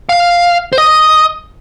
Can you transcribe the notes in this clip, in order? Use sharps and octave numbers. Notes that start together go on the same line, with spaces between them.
F5
C5
D#5